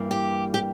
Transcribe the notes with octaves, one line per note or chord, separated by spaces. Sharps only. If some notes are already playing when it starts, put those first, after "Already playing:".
Already playing: G2 E3 G3 A#3
G4
G4